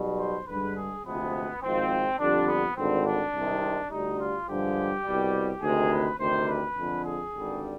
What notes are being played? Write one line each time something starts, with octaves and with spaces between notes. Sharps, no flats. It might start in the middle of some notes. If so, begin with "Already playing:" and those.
Already playing: B1 B2 G3
C5
G2 D3 G#3 B4
G#4
D2 C3 F3 G#3 B3
G#1 G#2 F3 G#3 C4
F2 D3 G3 D4
B3
G#1 G2 D3 C4
D4
C2 C3 D#3 G#3
D2 D3 G3 D#4
F4
G2 D3 F3 G#3 G4
C2 B2 G3
D2 C3 D#3 G#3 G#4
B4
D2 C3 D#3 G3 C5
B4
F2 D3 G#3
G#4
G#1 G2 D3 G3